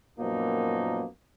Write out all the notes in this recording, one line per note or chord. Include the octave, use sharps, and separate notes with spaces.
F#2 A#2 F3 A#3 B3 D#4